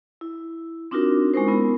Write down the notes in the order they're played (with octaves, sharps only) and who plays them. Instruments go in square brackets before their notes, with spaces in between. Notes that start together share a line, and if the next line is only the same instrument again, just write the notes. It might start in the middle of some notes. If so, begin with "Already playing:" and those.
[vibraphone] E4
C4 D4 D#4 F4 F#4 A#4
G#3 C#4 D#4 A#4 C5
B3 E4 A#4